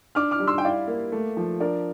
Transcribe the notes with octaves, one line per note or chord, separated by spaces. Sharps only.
D4 D6 F6
D6 F6
G3
C6 E6
G5
E4 D5 F5
A#3
A3
F3
D4 A#4 D5